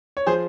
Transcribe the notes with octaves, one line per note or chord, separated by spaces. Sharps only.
C#5
F3 G#4 C5